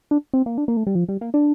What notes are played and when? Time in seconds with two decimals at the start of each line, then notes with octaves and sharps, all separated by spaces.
0.11 D4
0.33 C4
0.46 A#3
0.58 D4
0.68 A#3
0.77 A3
0.87 G3
0.95 F3
1.08 G3
1.21 A#3
1.34 D4